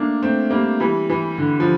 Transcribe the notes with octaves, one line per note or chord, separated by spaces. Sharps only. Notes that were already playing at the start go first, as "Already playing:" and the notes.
Already playing: A3 A#3 D4
A3 C4
G3 A#3
E3 G3
E3
D3
F3